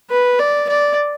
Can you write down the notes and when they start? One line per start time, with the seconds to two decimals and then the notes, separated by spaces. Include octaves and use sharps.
0.10 B4
0.39 D5
0.69 D5